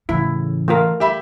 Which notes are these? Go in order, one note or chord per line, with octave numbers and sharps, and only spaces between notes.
A2 C#3 E3 E4
A3 F4 A#4
G4 E5 B5